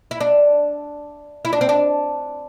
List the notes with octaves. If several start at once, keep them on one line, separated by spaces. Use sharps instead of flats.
E4
D4
E4
D4
C4
D4